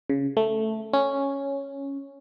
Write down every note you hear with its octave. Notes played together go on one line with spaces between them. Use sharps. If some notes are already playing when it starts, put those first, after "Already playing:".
C#3
A3
C#4